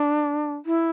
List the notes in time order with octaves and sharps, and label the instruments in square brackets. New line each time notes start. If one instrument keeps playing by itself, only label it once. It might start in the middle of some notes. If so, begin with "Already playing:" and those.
Already playing: [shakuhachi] D4
E4